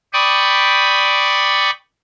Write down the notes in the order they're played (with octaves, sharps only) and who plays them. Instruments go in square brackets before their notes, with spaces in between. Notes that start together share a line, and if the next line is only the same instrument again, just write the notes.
[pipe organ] D5 G5 B5 C#6 D#6